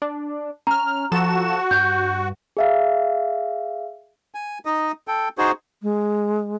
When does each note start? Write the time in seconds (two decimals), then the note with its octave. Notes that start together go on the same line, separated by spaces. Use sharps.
0.02 D4
0.67 C#4 A#5 F6
1.12 F3 F#4 A4 E7
1.71 G2 G6
2.57 G#4 E5 F5
4.35 G#5
4.65 D#4 D#5
5.08 A4 G5
5.38 D#4 F#4 G#4 C5
5.82 G#3